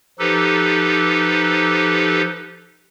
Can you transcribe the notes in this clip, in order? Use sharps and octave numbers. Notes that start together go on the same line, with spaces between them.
F3 D#4 G4 A4 B4